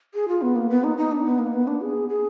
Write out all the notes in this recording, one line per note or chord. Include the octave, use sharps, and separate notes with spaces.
G#4
F4
B3
A#3
B3
D#4
D#4
D4
B3
A#3
B3
D4
G#4
G#4